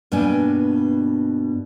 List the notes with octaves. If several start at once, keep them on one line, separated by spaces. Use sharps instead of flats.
G2 B2 A#3 B3 D4 G#5